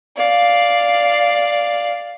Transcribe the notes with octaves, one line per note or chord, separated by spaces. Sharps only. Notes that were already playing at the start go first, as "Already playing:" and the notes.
D5 F5